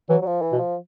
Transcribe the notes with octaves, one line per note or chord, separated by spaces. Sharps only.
E3 F#3
F#3
F3
E3
B2
F3